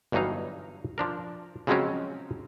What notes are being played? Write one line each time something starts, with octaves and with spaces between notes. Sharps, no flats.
G1 G2 E3 F#3 D#4 F5
F3 D4 A#4
C#3 F3 F#3 G#3 C4 C#4